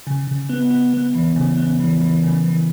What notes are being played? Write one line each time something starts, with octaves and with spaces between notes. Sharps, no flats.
C#3
C#3
B3
B3
B3
E3
C#3
B3
E3
E3
C#3
E3